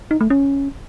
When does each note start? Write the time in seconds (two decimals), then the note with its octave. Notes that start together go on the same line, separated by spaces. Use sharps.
0.11 D#4
0.21 A3
0.30 C#4